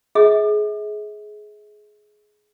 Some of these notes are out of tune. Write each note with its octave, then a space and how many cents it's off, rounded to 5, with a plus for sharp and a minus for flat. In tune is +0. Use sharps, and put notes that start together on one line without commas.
G#4 +20 E5 -45